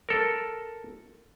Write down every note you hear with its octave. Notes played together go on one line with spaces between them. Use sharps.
A4 A#4